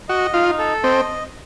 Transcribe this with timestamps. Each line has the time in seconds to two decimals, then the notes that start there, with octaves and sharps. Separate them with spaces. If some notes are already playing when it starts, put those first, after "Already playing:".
0.09 F#4 D#5
0.33 D#4 F4
0.58 A4
0.84 C4 D#5